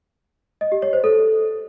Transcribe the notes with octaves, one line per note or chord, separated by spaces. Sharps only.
D#5
G4
C#5
C5
A4